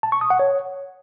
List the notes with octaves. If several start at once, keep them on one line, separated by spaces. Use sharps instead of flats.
A5
C#6
D#6
F#5
C#5